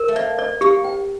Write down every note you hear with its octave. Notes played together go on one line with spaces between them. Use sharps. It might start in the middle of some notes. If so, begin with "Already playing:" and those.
Already playing: A#4
A3
A#3 D5
D5
A#3 G4
G5